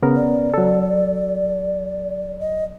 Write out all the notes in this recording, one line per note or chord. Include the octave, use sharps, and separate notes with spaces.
C#3 B3 A#4
D5
F#3 A4
D#5